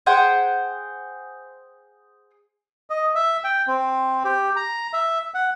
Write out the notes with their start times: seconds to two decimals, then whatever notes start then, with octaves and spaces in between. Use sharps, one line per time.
0.06 G#4 C5 F#5 G5
2.90 D#5
3.15 E5
3.44 G5
3.67 C4
4.24 G4
4.56 A#5
4.93 E5
5.34 F#5